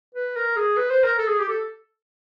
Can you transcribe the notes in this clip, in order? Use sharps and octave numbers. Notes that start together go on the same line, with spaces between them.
B4
A#4
G#4
B4
C5
A#4
A4
G#4
G4
A4